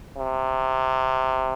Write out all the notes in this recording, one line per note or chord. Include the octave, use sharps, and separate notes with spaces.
C3